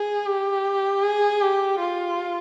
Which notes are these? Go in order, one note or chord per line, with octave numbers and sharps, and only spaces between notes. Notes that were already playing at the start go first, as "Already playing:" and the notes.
Already playing: G#4
G4
G#4
G4
F4